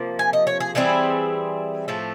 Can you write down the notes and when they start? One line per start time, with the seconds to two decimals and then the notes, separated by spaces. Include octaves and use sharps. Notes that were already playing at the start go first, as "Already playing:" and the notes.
Already playing: C3 F3 A#3
0.19 G#5
0.33 D#5
0.47 C#5
0.60 G#4
0.75 E3 G3 C4 E4 G#4
1.88 A2 F3 A3 C4